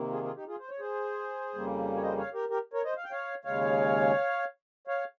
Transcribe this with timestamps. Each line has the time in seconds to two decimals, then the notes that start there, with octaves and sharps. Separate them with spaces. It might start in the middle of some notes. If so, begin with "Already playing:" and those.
Already playing: C3 D#3 A#3
0.11 F4 G#4
0.24 F4 G#4
0.36 D#4 G4
0.47 F4 G#4
0.60 C5
0.70 C#5
0.79 G#4 C5
1.54 F2 C#3 G3 A#3
1.97 C#5
2.02 C5 D#5
2.17 C#5 F5
2.34 G4 A#4
2.50 G4 A#4
2.74 A#4 C#5
2.85 C5 D#5
2.97 F5
3.04 G5
3.11 C#5 F5
3.45 D#2 C#3 G#3 C#5 F5
4.87 C#5 F5